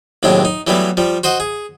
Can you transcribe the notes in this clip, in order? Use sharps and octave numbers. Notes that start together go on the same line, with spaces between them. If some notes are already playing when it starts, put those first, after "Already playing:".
D#2 A2 C3 F#3 G#3 D4
D#4
E3 F#3 G3 A3 B3
F3 G3
F#4 C5 D#5 F#5
G#4